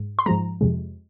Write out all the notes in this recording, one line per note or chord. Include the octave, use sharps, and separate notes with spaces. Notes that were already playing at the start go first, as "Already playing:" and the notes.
Already playing: G#2
C6
G#2 F3 G#3 A#5
F2 C3 G#3